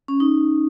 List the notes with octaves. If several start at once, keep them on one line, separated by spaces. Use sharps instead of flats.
C#4
D#4